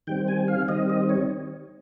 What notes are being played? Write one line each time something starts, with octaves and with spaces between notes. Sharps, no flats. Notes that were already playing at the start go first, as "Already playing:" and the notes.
D#3 G3 C4 G5
G#5
F5
D#3 G3 C4 D#5
D#5
C#5